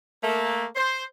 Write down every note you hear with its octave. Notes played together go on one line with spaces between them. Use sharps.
A3 A#3
C5